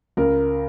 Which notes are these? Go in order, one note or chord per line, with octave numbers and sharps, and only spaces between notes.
C#2 A#4